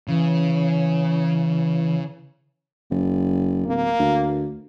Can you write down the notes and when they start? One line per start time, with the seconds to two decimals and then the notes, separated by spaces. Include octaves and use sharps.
0.08 C#3 E3
2.90 F#1
3.67 D1 A#3
3.99 D2